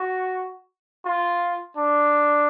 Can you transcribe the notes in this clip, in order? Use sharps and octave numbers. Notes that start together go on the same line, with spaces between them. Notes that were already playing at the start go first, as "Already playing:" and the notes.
Already playing: F#4
F4
D4